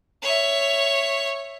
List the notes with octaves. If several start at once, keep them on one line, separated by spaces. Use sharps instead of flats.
C#5 E5